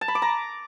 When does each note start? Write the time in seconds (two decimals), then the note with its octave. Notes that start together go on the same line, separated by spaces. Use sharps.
0.01 A5
0.08 B5
0.15 D6
0.22 A#5